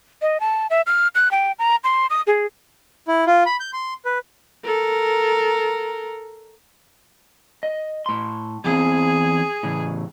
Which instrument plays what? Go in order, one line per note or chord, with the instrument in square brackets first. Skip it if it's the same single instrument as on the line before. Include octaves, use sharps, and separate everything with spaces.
[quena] D#5
A5
E5
F6
F#6
G5
A#5
C6
D#6
G#4
[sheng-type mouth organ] E4
F4
B5
G6
C6
B4
[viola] A4 A#4
[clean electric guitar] D#5
A2 C6
[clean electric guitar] E2 E3 C4 [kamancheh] G#4
[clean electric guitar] A2 C#3 E3